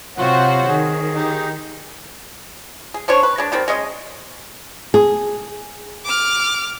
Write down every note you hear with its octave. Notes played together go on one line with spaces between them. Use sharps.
C3 F4 F#4 C5 C#5 F#5
D#3 G#4
D#4 G4
G#4
C#4 D4 C5 C#5
B4
G#3 D4
D#3 G3 C4
G#3 C#4 D#5
G#4
D6 F6